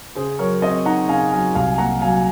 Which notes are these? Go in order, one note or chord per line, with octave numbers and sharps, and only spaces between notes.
C#3 G#4 C5
F#3 A#4 C#5
C4 C5 D#5
D#4 F#5 A#5
C#3 F5 G#5
F#3 F5 G#5
C2 F5 G#5
A#2 F#5 A#5
F#3 F5 G#5